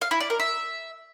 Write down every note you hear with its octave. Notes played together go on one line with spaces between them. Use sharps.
F5
E4
D5
A#4
E5